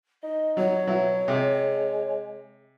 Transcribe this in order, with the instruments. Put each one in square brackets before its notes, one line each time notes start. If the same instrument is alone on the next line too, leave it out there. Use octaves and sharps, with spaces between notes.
[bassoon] D#4 [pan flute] D#5
[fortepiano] F#3 [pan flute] C#5
[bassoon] B2 [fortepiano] F#3 E4
[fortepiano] C3 [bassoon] G#3